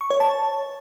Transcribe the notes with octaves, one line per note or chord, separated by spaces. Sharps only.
C#6
C#5
A5